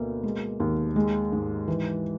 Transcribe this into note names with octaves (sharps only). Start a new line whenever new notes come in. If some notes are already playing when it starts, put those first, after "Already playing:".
Already playing: D2 B2 A#3
G#3
D#2
G#3
G#2
E3